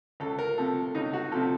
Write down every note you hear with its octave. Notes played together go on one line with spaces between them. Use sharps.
C#2 A4
A#4
C3 F3 A4
C#2 D#4
F#4
C3 F3 A4